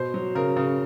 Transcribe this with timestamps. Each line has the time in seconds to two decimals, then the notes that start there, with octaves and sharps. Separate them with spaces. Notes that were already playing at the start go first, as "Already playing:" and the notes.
Already playing: B2 C5
0.14 F#3
0.35 C#3 A#4
0.56 C#3